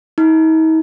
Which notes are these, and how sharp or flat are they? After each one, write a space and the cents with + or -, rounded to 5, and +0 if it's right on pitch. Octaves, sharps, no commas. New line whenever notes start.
D#4 +45